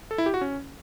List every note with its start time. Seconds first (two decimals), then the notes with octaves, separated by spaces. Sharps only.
0.11 A4
0.18 E4
0.26 G4
0.34 F#4
0.41 C#4